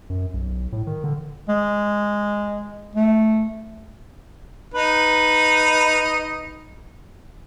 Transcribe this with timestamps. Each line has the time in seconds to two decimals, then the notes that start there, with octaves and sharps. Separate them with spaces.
0.10 F#2
0.34 B1
0.72 A2
0.87 D#3
1.04 D3
1.49 G#3
2.96 A3
4.74 D#4 B4